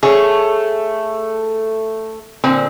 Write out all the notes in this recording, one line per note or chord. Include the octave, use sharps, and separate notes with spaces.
A3 G#4 C#5
A#2 D3 C4